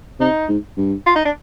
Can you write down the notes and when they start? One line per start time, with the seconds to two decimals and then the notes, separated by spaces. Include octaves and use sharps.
0.20 C3 D#4
0.48 G#2
0.77 G2
1.06 F4
1.16 D#4
1.25 D4